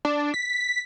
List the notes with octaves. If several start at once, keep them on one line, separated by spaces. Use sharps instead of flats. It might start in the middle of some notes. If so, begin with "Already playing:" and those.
D4
B6